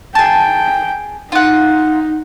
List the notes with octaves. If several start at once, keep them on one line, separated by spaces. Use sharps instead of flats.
G#4 G5 A5
D#4 F4 F#5